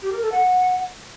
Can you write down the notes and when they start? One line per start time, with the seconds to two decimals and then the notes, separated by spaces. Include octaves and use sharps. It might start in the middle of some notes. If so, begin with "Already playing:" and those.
0.02 G4
0.12 A#4
0.22 A4
0.32 F#5